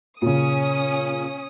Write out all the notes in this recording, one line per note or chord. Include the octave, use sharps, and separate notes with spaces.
A#2 C#3 C#4 D#6